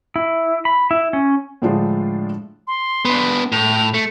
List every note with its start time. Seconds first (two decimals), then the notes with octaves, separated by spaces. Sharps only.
0.16 E4
0.65 B5
0.91 E4
1.13 C#4
1.62 A2 D3 F3 G#3 D4 F4
2.67 C6
3.05 B3 D4
3.52 A2 F7
3.94 A3 C#7